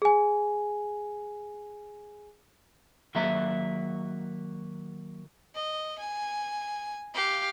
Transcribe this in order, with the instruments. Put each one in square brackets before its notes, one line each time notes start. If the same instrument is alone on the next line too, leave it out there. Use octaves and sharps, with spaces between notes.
[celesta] G#4 G#5
[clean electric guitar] D#3 F#3 A#3 F#4 E5 A#5
[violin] D#5
G#5
G4 F5